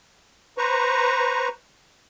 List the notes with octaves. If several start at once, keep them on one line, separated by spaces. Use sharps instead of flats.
B4 C5 A#5 C#6